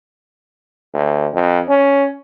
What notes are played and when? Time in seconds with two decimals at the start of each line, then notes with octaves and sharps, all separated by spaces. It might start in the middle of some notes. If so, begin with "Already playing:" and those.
0.94 D2
1.33 F2
1.69 C#4